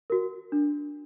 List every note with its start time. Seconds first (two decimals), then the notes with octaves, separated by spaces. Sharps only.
0.10 F#4 A#4
0.52 D4